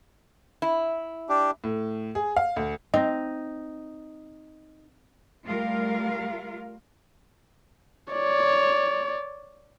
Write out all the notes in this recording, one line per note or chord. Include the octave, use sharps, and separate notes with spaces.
E4
D4 G4
A2
G#4
F5
D2
C4 D#4 D#5
G3 A3 F4 A#4 F5
C#5 D5